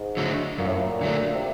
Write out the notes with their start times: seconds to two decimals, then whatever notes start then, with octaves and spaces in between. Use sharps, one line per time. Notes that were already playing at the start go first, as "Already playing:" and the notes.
Already playing: G#2
0.17 D3 F#3 A3
0.58 F#2 A#2
0.67 A2
0.76 A#2
1.01 D3 F#3 A3
1.34 C3